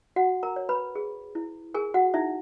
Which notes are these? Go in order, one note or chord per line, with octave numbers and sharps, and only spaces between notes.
F#4 F#5
A#4 A#5
C#5
B4 B5
G#4
E4
G#4 A#4 G#5
F#4 F#5
D#4 E4 E5